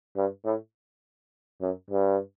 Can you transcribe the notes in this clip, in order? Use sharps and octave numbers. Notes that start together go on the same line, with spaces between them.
G2
A2
F#2
G2